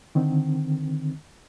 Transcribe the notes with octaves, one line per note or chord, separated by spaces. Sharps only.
D3 D#3 C4